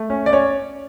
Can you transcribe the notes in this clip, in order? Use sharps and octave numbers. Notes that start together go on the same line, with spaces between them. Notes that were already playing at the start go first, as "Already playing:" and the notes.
Already playing: A3
C#4
D5
C#4 C#5